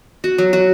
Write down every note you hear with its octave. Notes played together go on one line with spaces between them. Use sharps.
F#4
F#3
F#4